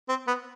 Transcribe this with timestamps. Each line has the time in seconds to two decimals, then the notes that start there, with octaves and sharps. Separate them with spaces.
0.09 C4
0.27 B3